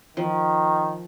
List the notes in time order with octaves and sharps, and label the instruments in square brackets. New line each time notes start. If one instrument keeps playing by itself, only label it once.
[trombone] D#3 [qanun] F3